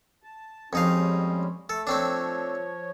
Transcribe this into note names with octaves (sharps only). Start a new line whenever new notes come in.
A5
F2 G3 G#3 C#4 D#4 F5
A3 A4
F3 A3 C4 D4 C#5